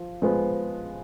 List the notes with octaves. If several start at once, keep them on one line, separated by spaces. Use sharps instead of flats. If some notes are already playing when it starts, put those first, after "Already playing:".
Already playing: F3
F3 G#3 B3